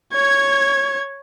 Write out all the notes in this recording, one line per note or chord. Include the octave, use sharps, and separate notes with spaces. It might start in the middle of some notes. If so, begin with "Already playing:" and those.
C#5 G#6